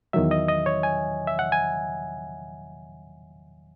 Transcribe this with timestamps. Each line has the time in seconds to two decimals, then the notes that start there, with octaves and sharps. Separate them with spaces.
0.13 E2 D#3 F#3 E5
0.31 D#5
0.48 D#5
0.66 C#5
0.83 G#5
1.27 E5
1.39 F#5
1.52 G#5